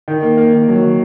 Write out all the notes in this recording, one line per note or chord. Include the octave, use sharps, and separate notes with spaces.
D#3
A#3
A#3
D#3
F#3
D#3